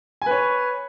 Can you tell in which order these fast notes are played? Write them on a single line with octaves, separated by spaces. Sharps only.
G#5 B4 C#5